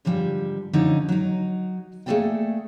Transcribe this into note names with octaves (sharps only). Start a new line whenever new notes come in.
G#2 D3 F3 G3
D3 F3 C#4 D#4
F#3 D#4
A3 A#3 G#4 A4 D5 G5